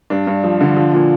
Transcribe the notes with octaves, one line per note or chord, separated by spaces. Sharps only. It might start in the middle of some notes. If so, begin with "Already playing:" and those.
G2 D4
G2
F3
D3
F3
A#2